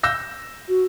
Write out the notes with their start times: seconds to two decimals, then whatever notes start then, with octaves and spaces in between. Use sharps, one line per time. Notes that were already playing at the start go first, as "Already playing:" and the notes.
0.03 E6 G6 A#6
0.69 F#4